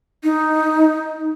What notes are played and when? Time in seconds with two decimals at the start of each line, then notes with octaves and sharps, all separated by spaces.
0.24 D#4